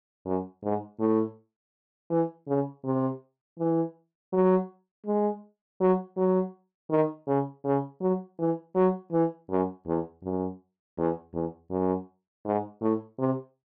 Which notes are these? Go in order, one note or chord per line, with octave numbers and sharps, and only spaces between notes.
F#2
G#2
A2
E3
C#3
C3
E3
F#3
G#3
F#3
F#3
D#3
C#3
C#3
F#3
E3
F#3
E3
F#2
E2
F#2
E2
E2
F#2
G#2
A2
C3